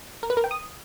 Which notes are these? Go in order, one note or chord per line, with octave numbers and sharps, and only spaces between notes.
A#4
B4
A#4
G5
D#6